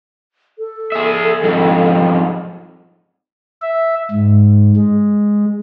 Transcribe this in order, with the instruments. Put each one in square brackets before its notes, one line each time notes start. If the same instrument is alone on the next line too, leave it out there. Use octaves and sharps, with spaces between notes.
[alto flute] A4
[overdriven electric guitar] G#4 E5
F2 G#2
[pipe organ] E5
G#2
G#3